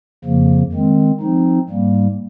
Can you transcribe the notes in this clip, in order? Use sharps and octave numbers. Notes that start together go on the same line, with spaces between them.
F2 C#3 F3 A#3
D#3 G#3 C4
F3 C4 D#4
G#2 G3 A#3